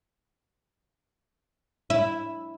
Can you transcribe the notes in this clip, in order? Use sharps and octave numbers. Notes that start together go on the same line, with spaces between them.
E4